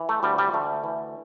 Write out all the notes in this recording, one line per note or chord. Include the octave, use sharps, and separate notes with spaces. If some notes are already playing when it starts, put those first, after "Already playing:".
Already playing: E3
A3
D2 G3
G3
D2 A3
E3